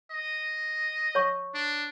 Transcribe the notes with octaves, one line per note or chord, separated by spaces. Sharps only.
D#5
C#5 C#6
D4